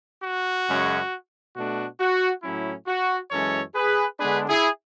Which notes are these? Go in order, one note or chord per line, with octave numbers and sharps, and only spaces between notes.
F#4
F#2 C#3 G#3 C#4
B2 A3 D4 F#4
F#4
A2 F#3 C#4 E4
F#4
F#2 E3 G#3 C#4 A4 C#5
G#4 B4
D3 G#3 B3 D4 G#4 B4
E4 G#4